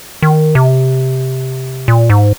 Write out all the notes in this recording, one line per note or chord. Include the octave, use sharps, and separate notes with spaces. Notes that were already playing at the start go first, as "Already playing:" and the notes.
D#3
C3
A#2
G#2